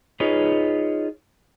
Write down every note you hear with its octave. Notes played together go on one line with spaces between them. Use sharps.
D#4 F4 G#4 B4 C#5 D#5